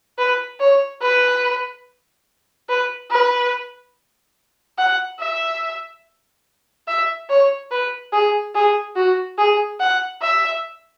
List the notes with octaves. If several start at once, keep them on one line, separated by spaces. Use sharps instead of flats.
B4
C#5
B4
B4
B4
F#5
E5
E5
C#5
B4
G#4
G#4
F#4
G#4
F#5
E5